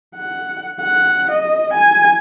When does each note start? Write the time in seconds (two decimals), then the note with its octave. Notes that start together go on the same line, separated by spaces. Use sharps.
0.16 F#5
0.80 F#5
1.31 D#5
1.74 G#5